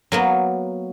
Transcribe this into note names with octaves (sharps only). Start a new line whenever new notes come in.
F#3 A#3 B3